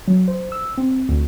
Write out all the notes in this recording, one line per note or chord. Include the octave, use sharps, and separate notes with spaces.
F#3
C5
E6
C4
D2